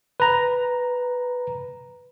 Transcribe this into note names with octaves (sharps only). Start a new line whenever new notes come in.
B4 A#5